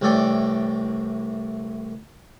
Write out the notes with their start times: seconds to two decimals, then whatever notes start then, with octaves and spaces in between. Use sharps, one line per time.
0.01 C2 A2 E3 A4 D5 G5